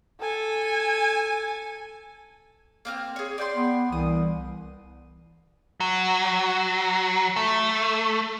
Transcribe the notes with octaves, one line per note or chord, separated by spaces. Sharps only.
A4 G#5
A#3 C4 F6
G#4 C#5
D5 G5 C6
B3
C2 E3 D#6
F#3
A3